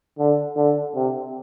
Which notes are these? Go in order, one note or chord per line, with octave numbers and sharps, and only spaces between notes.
D3
D3
C3